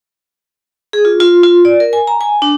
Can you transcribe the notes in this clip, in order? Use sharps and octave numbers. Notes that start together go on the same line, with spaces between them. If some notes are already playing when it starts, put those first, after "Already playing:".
G#4
F4
F4
F4
D5
A#4
G#5
A#5
G#5
D4